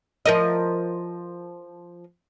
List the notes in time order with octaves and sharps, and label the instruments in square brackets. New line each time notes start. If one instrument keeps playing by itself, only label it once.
[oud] F3 A#4 D#5